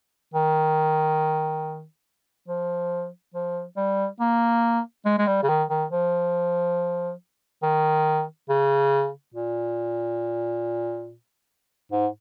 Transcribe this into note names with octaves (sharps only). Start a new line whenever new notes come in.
D#3
F3
F3
G3
A#3
G#3
G#3
G3
C#3
D#3
D#3
F3
D#3
C#3
A#2
G#2